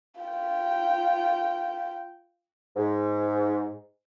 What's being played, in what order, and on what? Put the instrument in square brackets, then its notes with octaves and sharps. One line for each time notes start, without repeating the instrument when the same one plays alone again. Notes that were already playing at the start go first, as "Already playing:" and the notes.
[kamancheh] F4 G5
[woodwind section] G#2